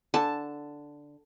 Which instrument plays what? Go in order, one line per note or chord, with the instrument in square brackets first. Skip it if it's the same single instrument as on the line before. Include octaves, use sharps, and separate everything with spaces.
[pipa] D3 [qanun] A5